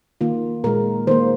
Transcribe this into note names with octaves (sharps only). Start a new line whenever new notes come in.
D#3 A#3 F4
A#2 G#3 A#4
D#3 A#3 C5